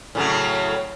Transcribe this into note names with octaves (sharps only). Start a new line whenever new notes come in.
A2 C#3 F#3